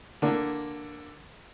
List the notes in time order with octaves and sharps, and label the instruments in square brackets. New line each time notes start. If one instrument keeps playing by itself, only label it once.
[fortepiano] D3 A#3